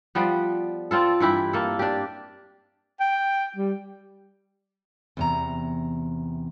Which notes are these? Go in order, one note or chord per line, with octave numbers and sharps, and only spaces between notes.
F3 G3 B3
C4 F4 A4
G2 E3 E4 G4
A#3 A4
D4 G4
G5
G3
E2 C3 A#5